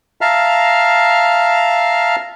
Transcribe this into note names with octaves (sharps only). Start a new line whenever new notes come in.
E5 F5 A5 A#5 F6